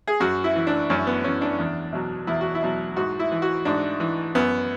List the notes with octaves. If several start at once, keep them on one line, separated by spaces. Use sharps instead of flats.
G#4
F#2 F#4
E4
E3
D4
F#2 C#4
B3
E3 C#4
D4
E2
B2 F#3
E2 E4
F#4
E4
B2 F#3
G#2 F#4
E4
E3
F#4
G#2 D4
E3
F#2 B3